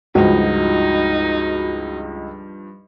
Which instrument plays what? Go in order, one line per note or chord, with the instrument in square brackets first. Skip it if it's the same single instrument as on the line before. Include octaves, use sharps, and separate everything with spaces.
[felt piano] C#2 [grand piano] G2 F3 [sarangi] D#4 [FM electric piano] F#4